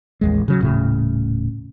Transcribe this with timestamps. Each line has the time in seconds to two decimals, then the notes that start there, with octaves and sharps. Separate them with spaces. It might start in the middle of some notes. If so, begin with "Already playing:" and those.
0.21 A1 D#2 G#3
0.48 C#3 F#3
0.61 D#1 A2 C#3